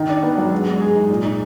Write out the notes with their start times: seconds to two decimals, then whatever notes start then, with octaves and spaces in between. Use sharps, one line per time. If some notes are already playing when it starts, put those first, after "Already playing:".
Already playing: D#3 D#4
0.09 D4
0.23 B3
0.38 F#3
0.52 G#3
0.66 G#3
0.81 G#4
0.95 D#4
1.10 A#2
1.24 D#4